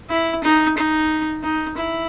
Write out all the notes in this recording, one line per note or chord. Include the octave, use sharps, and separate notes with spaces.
E4
D#4
D#4
D#4
E4